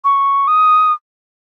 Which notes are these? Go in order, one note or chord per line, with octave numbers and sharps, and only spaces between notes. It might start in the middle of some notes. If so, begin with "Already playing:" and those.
C#6
D#6